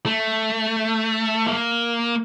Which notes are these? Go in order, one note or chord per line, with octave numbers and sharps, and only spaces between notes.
A3
A#3